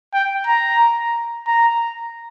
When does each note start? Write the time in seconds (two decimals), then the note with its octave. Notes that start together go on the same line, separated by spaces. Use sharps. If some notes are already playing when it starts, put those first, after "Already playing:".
0.13 G5
0.46 A#5
1.47 A#5